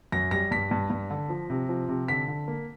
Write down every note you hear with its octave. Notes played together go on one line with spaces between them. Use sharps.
F#2 A#6
G3 A#6
G2 B6
G2
G2
D3
F3
C3
F3
C3
D3 B6
D3
A#3